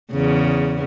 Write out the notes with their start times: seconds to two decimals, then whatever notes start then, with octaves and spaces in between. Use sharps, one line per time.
0.12 E2 C#3